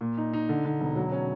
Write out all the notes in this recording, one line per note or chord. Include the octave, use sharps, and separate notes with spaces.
A#2
D#4
D#4
D3
D3
E1
F#3
C#4